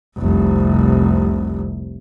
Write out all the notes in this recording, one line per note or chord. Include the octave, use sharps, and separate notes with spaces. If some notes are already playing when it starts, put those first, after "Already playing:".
F1 C2